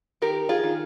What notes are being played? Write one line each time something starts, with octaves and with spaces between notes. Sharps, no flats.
D#3 G4 A#4
F4 G#4
D#3